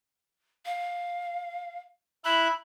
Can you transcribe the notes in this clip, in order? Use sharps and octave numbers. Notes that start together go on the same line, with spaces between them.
F5
E4 E5 B5 F#6